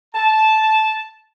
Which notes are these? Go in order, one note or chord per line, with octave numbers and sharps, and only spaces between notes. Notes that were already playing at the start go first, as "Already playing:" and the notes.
A5